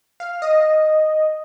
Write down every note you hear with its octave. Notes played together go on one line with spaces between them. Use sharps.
F5
D#5